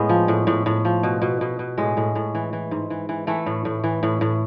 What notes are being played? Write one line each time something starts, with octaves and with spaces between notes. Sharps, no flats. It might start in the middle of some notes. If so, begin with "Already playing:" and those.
Already playing: A2 G#3 B3
F3
A2
A2
A2
F3
B2
B2
B2
B2
A2 G#3
A2
A2
E3
E3
G#2
E3
E3
E3 A3
A2
A2
E3
A2
A2